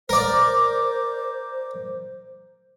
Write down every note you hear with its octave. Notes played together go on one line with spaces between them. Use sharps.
A#4 C5 D5